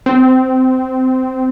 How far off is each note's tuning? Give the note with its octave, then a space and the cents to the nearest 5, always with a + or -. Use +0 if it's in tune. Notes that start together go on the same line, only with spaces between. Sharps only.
C4 -15